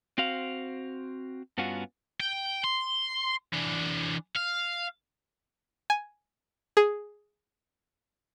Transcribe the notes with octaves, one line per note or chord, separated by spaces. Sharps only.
C4 F#4 C5 F5
G2 B3 C#4 F4 F#4
G5
C6
E3 D4
F5
G#5
G#4